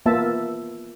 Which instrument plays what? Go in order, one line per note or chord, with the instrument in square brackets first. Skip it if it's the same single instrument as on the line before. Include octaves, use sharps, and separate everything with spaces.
[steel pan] A#3 B3 F4 E5 A5